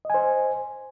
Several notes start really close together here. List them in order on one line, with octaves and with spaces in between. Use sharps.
D#5 G#5 C5